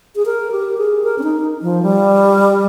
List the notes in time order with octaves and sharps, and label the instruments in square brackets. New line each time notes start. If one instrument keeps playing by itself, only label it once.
[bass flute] G#4
A#4
G4
G#4
A#4
C#4
D#4
F3
G3